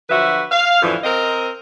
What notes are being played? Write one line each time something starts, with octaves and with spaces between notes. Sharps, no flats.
D3 F3 F#3 F#4 B4 E5
F5
F#2 A2 D3 E3 F3
C4 A#4 D#5